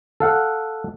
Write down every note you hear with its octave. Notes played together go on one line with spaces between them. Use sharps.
A4 F5 F#5